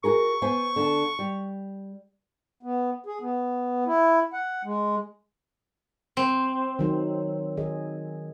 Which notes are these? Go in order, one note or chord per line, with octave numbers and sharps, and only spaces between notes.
F#4 G#4 A#4 C#6
B3 C5 G#5
D3 A5
G3
B3
G#4
B3
E4
F#5
G#3
C4
D#3 F#3 D#4
D#3 G#4 D#5